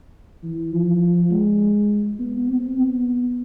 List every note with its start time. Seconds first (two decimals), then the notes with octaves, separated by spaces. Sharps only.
0.43 E3
0.72 F3
1.31 G#3
2.19 B3
2.49 C4
2.78 B3